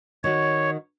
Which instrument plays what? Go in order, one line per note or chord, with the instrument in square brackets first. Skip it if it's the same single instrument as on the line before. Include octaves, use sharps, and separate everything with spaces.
[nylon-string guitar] D#3 F#4 [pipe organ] C#5